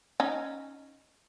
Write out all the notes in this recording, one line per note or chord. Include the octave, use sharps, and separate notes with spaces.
C#4 D#4